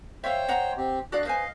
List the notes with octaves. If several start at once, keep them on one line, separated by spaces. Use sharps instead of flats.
C5 C#5 E5 F5 G5
D#5 F#5 A#5
C4 G4
D4 F#4 D5 D#5 F5 F#6
B4 C5 D#5 F5 G#5